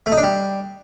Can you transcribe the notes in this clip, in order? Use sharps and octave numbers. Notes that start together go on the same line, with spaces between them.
A3
D#4
D4
G3